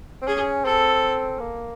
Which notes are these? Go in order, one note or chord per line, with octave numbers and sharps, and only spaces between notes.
C4
C#4 G#4
C4 A4
A#3